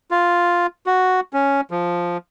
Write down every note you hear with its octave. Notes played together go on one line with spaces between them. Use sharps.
F4
F#4
C#4
F3